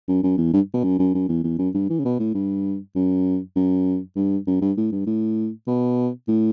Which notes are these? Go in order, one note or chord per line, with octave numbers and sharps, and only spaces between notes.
F#2
F#2
E2
G2
B2
F#2
F#2
F#2
E2
E2
F#2
G2
E3
C#3
B2
A2
G2
F#2
F#2
G2
F#2
G2
A2
G2
A2
B2
A2